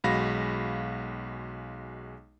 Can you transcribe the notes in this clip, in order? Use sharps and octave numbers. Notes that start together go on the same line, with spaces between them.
B1 G#3 F#4 F5 B5 A#6